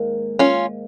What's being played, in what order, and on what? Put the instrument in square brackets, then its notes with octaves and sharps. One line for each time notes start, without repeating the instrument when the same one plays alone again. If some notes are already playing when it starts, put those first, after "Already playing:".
Already playing: [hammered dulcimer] G#2 D#3 A#3
[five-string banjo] C#4 F4